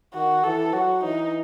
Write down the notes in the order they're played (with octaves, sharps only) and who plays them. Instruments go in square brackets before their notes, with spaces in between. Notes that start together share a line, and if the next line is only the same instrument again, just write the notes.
[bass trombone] D#3 [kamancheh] F#4
[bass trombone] E3 [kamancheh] A4
[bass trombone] F#3 [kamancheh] F#4
[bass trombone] E3 [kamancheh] D#4